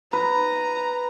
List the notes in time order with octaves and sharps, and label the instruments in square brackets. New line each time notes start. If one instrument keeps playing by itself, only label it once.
[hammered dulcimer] B4 [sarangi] A#5